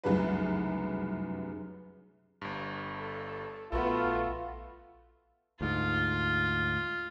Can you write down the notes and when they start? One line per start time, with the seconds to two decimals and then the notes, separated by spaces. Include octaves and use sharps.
0.04 F1 C2 F#2 C#3 F#3 B4
2.42 G1 G2
2.98 A4
3.72 A#1 A3 B3 F4 F#4 A4
5.61 D2 G#2 F4